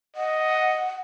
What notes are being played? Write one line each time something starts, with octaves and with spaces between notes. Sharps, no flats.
D#5 F#5